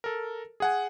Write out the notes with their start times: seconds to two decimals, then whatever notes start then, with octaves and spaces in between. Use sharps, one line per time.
0.04 A4 A#4
0.60 G#4 F#5 G#5